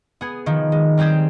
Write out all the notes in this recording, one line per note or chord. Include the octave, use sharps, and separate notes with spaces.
B3 G#4
D#3 F3
G#3
G3 C4 G4 G#4 C5